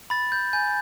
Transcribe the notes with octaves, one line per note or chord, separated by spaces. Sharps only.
B5 A6
G6
G#5 G6